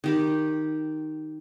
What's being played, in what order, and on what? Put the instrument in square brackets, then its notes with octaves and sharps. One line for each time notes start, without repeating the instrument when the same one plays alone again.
[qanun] D#3 G4 B5